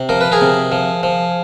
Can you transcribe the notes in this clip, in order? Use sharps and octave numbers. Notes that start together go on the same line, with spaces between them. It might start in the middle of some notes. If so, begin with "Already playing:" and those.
Already playing: C3
F3 A#4
B4
G#4 A#4
C3
F3
F3